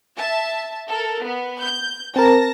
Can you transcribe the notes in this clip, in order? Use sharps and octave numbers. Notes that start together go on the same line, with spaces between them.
E5 A5
A4 A#4
B3
G6
C4 A#4 A5 A#6